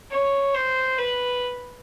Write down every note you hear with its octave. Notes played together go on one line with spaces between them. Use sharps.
C#5
C5
B4